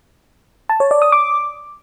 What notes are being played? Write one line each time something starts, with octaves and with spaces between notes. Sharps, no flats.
A5
C#5
D5
D#6
D6